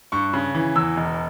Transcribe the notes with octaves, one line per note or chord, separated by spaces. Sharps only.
G2 C#6
C#3
E3
E2 E6
E1